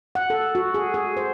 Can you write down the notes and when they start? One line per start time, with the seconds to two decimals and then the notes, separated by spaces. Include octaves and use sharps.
0.15 F#5
0.30 A4
0.55 F#4
0.74 G#4
0.94 G#4
1.17 C5